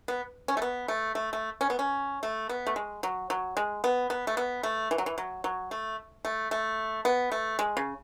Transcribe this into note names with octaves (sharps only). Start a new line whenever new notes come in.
B3
C#4
A3
B3
A3
A3
A3
C#4
B3
C#4
A3
B3
A3
G#3
F#3
F#3
G#3
B3
B3
A3
B3
A3
E3
F#3
E3
F#3
F#3
A3
A3
A3
B3
A3
G#3
C#3